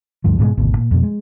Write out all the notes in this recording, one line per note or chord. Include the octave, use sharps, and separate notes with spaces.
D2 G2 F3
G#2 B2 D#3 G#3
G#1 D2 B2
A#2
F2 B2
G#3